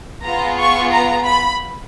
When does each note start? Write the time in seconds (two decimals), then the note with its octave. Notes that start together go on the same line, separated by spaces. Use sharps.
0.25 B3 F4 G#4 A#5
0.59 C#6
0.93 A#5
1.27 B5